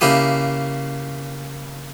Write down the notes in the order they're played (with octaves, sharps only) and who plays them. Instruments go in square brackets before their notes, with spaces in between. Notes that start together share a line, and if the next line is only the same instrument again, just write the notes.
[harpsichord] C#3 A#3 E4 G4 D#6